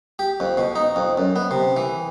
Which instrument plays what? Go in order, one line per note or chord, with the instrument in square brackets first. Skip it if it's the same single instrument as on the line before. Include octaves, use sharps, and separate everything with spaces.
[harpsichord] G4
F2
B2
D#4
F2
F#2
B3
C3
E3